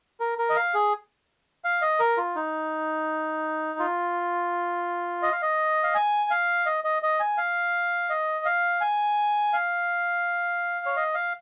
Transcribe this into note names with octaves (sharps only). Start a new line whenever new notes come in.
A#4
A#4
D#5
F5
G#4
F5
D#5
A#4
F4
D#4
F4
D#5
F5
D#5
F5
G#5
F5
D#5
D#5
D#5
G#5
F5
D#5
F5
G#5
F5
C#5
D#5
F5